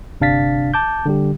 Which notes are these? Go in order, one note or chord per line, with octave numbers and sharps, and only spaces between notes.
G1 C3 D4 F5 A6 B6
A5 D6 G6
D3 G3 G4